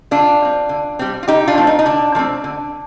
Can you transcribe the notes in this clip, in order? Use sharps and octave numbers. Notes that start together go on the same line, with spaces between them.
D3 D4 F4
G3 C4
D3
G3 C4
F4
D3 D#4 G4
D4 F4
F3 A3 C4
D#4
D#4
D3 D4
F3 A3 C4
D3